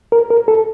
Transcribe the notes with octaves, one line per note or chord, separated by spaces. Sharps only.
A#4
A#4
A4